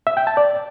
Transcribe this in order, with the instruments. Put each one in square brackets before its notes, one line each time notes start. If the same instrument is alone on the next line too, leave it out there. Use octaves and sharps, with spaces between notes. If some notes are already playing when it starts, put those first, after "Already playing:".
[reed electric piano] E5
G5
A5
D5